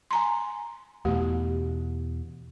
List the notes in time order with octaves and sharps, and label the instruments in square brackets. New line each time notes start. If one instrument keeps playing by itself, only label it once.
[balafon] G#5 A#5 C6
[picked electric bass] E2 B2 [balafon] A3 G4